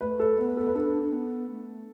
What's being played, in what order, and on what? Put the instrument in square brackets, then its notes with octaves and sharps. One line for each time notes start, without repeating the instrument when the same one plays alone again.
[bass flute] A3 [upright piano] B4
[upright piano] A4
[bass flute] B3 [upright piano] B4
[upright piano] A4
B4
[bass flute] D4 [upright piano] A4
[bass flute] D4
B3
A3